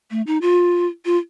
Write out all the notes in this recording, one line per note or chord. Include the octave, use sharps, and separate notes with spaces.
A3
D#4
F4
F4